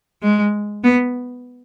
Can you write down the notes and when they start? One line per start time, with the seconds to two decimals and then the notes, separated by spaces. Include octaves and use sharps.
0.22 G#3
0.84 B3